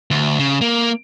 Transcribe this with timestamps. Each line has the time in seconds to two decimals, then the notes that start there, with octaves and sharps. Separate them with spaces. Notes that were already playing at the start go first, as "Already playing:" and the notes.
0.11 D2
0.39 C#3
0.61 A#3